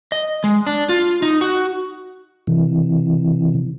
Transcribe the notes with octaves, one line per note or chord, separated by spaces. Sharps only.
D#5
G#3
D4
F4
D#4
F#4
C3 E3